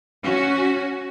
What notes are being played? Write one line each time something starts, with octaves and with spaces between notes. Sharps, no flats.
C#4 F#4